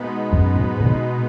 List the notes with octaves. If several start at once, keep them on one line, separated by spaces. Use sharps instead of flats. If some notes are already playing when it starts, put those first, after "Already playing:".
Already playing: B2 G#3 B3 D#4 B4
F#2
G#2
G#2
B2